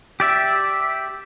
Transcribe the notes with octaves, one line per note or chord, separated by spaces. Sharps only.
G4 D5 E5